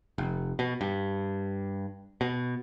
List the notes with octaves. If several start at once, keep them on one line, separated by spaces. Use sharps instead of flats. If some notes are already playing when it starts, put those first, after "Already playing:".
F1
B2
G2
B2